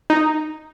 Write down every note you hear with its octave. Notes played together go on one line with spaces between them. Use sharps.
D#4